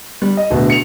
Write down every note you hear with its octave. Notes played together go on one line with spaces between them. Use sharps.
G3
D#5
D1 D2 B2
C#7 F7